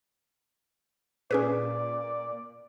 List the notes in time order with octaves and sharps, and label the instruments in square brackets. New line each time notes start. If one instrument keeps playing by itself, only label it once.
[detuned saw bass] A#2 [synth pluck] C#4 G#4 B4 [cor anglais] D5